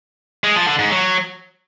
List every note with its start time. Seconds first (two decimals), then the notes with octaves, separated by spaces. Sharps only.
0.44 G#3
0.56 F3
0.67 D3
0.79 G#2
0.91 F#3